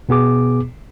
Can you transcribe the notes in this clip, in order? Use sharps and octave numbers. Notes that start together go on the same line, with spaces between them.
B2 B3 G#4 D6